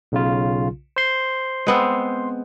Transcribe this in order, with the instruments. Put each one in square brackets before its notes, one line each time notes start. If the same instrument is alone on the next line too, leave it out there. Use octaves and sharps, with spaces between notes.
[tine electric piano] B1 C#3 F4
C5 C6
[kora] G#3 B3 C4